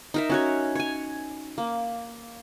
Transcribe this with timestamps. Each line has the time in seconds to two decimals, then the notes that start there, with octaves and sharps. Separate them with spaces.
0.14 D#4 A#4 E5
0.30 C#4 F#4 C#5
0.75 C#5 G#5
1.58 A#3